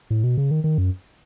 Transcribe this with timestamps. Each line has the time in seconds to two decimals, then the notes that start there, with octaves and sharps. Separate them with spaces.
0.10 A2
0.24 B2
0.37 C#3
0.51 D#3
0.64 D#3
0.78 F#2